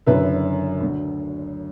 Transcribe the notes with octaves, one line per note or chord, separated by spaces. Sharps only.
F#1 F#2 D3 B4 E5
D2 D3